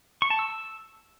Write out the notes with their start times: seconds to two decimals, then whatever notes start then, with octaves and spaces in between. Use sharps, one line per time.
0.22 C#6
0.30 A5
0.39 E6